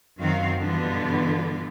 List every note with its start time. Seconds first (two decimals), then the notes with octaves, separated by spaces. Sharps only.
0.19 F#2 D#3 C4 F#4 A#4 F5
0.59 G2 B2 D3 E3 B3 F4